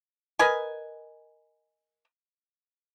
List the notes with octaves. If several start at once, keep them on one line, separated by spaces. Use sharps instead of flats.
A#4 B4 D#5 G#5